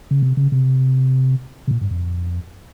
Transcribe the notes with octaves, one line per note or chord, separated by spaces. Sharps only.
C#3
C3
C#3
C3
C3
A#2
G2
F2